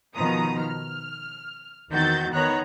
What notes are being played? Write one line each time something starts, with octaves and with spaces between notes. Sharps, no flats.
B2 D#3 F3 B3 A#5 D#6
F6
E2 D#3 C4 F#4 G6 A6
D#3 B3 C#5 A#5 F#6